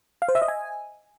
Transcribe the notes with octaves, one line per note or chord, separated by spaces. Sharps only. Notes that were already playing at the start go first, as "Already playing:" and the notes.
F5
C5
E5
D#5
G#5